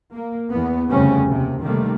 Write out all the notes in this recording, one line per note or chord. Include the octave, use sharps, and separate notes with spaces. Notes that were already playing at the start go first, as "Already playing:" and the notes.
A#3
E2 B3
F1 D2 C#3 G3 C4 C#4
D#2 C3
C3 D#3 G3 A3 A#3